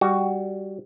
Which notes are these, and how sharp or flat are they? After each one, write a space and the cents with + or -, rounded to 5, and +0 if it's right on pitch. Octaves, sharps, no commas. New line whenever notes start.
G3 +0 F#4 +10